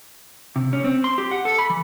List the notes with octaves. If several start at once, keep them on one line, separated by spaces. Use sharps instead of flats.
C3
C#4
C4
C6
G4
F#5
A4
B5
E3